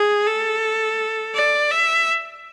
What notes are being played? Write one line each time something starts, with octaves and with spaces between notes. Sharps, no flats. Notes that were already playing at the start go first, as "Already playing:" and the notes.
Already playing: G#4
A4
D5
E5